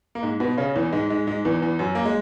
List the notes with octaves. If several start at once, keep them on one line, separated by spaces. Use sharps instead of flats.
A#3
G#2 G#3
B2 B3
C#3 C#4
E2 E3
G#2 G#3
G#2 G#3
G#2 G#3
E2 E3
E2 E3
F#2 F#3
A#3
G#3